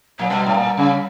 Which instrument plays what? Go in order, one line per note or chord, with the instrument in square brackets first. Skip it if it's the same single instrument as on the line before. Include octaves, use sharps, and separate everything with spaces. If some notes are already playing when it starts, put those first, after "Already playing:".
[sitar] A#2 [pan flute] F#3
[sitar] B2 [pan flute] G3
[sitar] A2
A#2
C#3